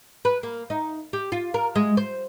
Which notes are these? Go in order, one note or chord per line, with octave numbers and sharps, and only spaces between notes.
B4
A#3
D#4
G4
F4
A#4
G#3
C5